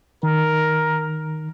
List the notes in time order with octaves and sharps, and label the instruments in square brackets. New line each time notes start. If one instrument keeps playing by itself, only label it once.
[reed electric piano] D#3 [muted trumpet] A#4